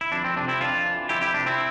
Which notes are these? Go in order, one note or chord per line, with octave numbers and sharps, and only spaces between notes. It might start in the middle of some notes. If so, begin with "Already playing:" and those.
E4
F2 D4
C4
C3 D4
C4 E4
F2 D4 F4
E3
F2 E4 G4
E4 G4
C3 D4
C4 E4